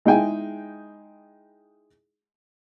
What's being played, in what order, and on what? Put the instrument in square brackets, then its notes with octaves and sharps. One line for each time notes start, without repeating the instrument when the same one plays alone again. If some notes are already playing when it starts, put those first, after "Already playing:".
[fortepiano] G#3 D#4 E4 G5 G#5